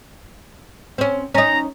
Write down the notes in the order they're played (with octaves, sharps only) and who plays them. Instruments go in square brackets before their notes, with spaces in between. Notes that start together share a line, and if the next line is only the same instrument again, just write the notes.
[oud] C4 C#4
[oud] C#4 D#4 [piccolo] A#5